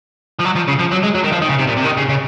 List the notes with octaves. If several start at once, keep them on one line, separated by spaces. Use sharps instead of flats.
F3
F#3
F3
C#3
F3
F#3
G#3
F#3
D#3
F3
D#3
C#3
C3
A#2
C3
D#3
C#3
C#3